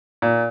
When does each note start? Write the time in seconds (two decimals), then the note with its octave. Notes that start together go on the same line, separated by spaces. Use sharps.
0.22 A#2